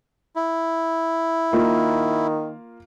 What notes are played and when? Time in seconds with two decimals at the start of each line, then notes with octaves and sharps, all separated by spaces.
0.36 E4
1.53 D#3 A#3 F4